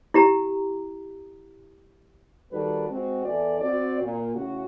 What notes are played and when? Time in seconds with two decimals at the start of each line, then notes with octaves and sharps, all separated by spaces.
0.14 E4 G4 A#5
2.52 D#3 G3 D4 F#4 A4 B4
2.89 G#3 C4 F#4
3.25 E2 E3 A4 D5
3.61 C4 F#4 D5
4.02 A#2
4.35 A2 C#3 F#4